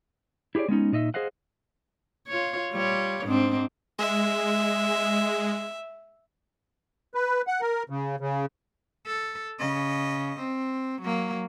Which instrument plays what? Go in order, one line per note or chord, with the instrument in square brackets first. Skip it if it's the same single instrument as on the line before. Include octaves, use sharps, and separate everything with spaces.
[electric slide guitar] E4 G4 G#4 C#5 D5
G#3 B3 C#4 D#4
A#2 D#4 D#5 E5
G#4 C5 D#5 F5 F#5
[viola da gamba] F4 C#5
G3 F4 C#5
G#2 C4 D4
[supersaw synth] G#3 [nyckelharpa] E5
[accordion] B4
F#5
A#4
C#3
C#3
[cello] A4
C#3 D#5
C4
F#3 A#3